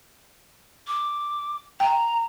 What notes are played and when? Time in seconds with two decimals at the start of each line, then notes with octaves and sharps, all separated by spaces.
0.87 D6
1.80 G5 A#5